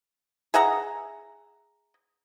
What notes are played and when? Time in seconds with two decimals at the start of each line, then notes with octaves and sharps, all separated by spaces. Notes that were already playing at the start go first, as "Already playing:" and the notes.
0.54 G#4 E5 F#5 A#5